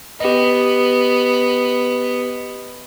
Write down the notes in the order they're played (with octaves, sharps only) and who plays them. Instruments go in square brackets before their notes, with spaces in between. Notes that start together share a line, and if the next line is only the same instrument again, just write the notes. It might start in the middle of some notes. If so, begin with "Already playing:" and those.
[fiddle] B3 [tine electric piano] G4 D#5